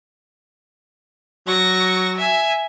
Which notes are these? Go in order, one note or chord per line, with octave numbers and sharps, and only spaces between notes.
F#3 C#6 A#6
E5 G#5